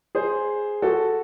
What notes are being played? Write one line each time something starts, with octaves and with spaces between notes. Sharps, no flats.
G#4 C5
F#4 A4